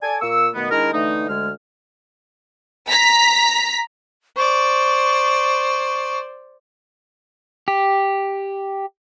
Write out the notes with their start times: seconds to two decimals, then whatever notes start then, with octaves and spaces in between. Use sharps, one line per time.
0.02 A4 D5 G#5
0.21 A#2 A#3 C#6 E6
0.54 B2 D#3 A3 B3
0.71 D#3 G#3 D4 E4 A#4
0.93 D3 E3 A3 D#4
1.28 D2 G#3 F6
2.89 A#5 B6
4.37 C5 D5 C#6
7.68 G4